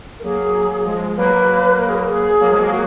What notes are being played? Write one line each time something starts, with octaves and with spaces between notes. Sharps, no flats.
A#4
F#3 A#3 G#4
F3 G#3
F#3 A#3 B4
A#4
G#4
A#4
G#4
F#3 A#3
F3 G#3
F#3 A#3
F#4